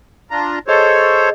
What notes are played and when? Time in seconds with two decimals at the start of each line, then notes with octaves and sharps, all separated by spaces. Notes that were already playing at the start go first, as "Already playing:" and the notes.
0.31 D4 F4 A#5
0.68 G#4 A4 C5 C#5 D#5 C#6